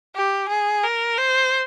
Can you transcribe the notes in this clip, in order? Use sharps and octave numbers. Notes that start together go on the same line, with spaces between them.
G4
G#4
A#4
C5